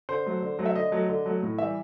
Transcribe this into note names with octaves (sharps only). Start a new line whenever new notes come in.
D3 C5
F#3 A3
D3
F#3 A3
E5
D3 D#5
F#3 A3
D3
F#3 A3
A2
E3 G3 E5